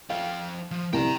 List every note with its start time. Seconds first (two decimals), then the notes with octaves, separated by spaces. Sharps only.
0.10 F3 F5 G5
0.71 F3
0.93 C2 G5 A#5